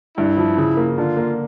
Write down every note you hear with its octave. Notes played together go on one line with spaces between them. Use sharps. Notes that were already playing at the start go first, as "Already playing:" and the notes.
G2 E4
F3
C#3
A#3
D3 F4
A#3